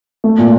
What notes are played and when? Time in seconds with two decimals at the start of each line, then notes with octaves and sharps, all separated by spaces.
0.24 A3
0.38 A#2